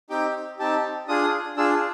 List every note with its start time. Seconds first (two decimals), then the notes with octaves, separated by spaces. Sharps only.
0.10 C4 D#4 G4 G5
0.59 C4 D#4 G4 A5
1.08 D4 F4 G#4 D#6
1.57 D4 F4 G#4 E6